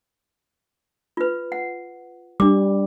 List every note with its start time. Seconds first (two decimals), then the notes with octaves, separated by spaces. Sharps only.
1.17 F4 B4
1.52 F#5
2.40 G3 D4 D6